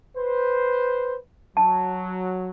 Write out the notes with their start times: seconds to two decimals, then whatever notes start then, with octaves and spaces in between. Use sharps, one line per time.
0.17 B4 C5
1.57 F#3 A5